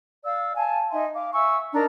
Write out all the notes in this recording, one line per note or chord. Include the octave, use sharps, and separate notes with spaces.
D5 F5 E6
F5 G#5 A5
D#4 E5 G#5 C6
F5 D6
E5 G#5 C#6 E6
D4 D#4 A#4 A#5